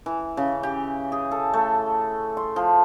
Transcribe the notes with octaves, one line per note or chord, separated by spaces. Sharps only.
E3
C#3
G4
G#4
A4
A3
C6
F3